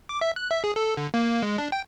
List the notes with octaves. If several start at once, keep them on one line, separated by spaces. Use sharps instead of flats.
D6
E5
F#6
E5
G#4
A4
D3
A#3
G#3
D4
G5